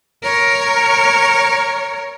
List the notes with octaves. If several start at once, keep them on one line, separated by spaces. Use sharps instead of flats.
A#4 C#5